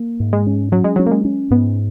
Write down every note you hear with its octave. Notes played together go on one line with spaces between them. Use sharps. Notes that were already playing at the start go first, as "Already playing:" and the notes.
Already playing: A#3
G#2
G#3
C#4
F#3 C#4
G#3
F#3 C#4
A#3
G#3
C#4
G#2 B3